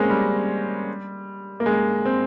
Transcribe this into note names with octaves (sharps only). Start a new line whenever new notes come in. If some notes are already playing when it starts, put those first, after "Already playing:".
Already playing: G#3 A#3 C4 C#4
G3
A#3
G#3
C4